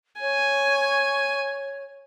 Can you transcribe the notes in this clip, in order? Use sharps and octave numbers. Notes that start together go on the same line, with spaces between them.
C#5 G#5